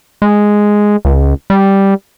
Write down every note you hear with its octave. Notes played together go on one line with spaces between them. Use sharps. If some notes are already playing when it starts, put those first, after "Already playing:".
G#3
C#2
G3